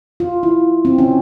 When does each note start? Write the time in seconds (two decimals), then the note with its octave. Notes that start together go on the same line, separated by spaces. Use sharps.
0.20 F4
0.43 E4
0.85 C4
0.98 C#4